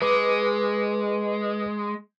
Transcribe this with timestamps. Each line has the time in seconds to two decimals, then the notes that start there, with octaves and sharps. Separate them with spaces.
0.02 G#3 B4 D6